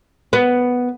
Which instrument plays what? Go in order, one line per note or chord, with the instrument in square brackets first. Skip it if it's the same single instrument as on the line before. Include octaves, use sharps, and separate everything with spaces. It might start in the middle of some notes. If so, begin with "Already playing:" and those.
[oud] B3